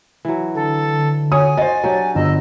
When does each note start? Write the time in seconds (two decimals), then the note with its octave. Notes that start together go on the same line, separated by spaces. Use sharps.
0.25 E3 F#3
0.55 D3 A4
1.32 F#4 C#5 G#5 D#6
1.57 F#4 C5 D#5 A6
1.84 F#3 D4 G4 C#5
2.15 G1 D#5 E6